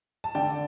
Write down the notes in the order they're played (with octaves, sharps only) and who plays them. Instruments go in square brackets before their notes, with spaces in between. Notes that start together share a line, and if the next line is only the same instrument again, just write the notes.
[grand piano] A5
D3 D5 G5